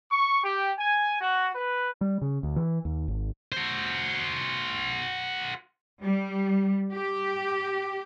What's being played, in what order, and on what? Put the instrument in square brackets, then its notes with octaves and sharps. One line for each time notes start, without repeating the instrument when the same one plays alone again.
[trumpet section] C#6
G4
G#5
F#4
B4
[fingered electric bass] G3
C#3
D2
E3
D#2
G#1
[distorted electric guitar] F#4 C5
[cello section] G3
G4